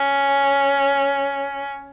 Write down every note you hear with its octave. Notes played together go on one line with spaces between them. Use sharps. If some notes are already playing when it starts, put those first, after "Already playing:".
Already playing: C#4